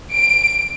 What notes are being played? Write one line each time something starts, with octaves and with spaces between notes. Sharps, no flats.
D7